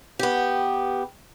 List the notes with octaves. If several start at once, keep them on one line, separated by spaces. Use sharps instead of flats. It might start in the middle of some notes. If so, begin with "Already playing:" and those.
B3 G4